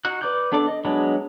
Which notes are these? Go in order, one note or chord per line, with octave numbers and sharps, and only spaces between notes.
D#4 F#4 F#6
B4 D5 D6 F#6 G6
B3 D4 A4 D5 D6
D#5
F#3 G#3 B3 D4